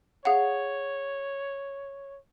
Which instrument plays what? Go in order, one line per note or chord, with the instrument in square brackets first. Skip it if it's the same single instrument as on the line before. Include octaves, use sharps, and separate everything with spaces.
[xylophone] G#4 F5 F#5 [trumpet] C#5